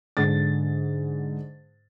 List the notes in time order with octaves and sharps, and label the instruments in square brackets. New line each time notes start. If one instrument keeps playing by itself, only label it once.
[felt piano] G#2 D3 A6